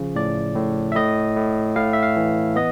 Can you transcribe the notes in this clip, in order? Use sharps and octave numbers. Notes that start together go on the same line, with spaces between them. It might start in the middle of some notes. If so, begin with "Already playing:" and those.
Already playing: C#3 F3
A2 D5
A2
E5
A2 D#5
A2
A2 F5
E5
F5
E3
B3 D#5